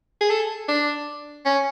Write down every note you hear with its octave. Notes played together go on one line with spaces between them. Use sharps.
G#4
A4
D4
C#4